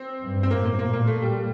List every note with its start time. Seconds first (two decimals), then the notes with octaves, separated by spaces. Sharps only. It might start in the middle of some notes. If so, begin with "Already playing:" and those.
Already playing: C4
0.21 G2
0.43 C4
0.51 A2 A#3
0.65 A#3
0.79 A#2 A#3
0.93 A#3
1.07 A3
1.22 G3